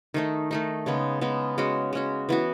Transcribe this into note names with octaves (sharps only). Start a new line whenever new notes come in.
D#3 A3 D#4
D#3 A3 D#4
C#3 G#3 B3
C#3 G#3 B3
G#3 C#4 F#4
G#3 C#4 F#4
E3 B3 F#4